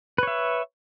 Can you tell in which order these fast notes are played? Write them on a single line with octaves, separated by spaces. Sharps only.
B4 C#5 E5